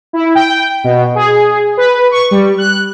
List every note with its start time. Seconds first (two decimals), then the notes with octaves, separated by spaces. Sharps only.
0.13 E4
0.35 G5
0.84 B2
1.15 G#4
1.77 B4
2.11 C#6
2.31 G3
2.58 F#6